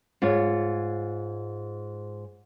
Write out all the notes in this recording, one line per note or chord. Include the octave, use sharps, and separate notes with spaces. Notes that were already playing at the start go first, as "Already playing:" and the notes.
G#2 F4 C#5